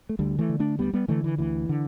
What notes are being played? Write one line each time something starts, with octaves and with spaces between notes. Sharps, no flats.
A3
D2 D3 G3
E3 A3
D3
A3 D4
D2 G3 B3
G3 B3
D3 E3 A3
E3
D2 E3
D3